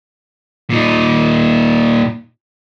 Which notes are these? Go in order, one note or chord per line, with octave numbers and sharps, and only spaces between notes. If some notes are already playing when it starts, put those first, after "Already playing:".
A#2 D#4